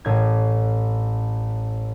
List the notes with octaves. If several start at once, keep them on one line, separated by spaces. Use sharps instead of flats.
A1 G#6